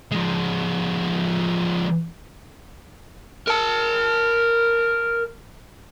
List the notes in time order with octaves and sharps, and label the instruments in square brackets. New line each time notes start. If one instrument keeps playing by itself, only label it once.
[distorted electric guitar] F3 G#3
[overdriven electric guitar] A#4 A5